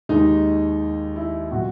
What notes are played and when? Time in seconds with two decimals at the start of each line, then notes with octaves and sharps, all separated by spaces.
0.09 D#2 D#3 G#3 D#4
1.16 E4
1.52 A#2 F#3 F#4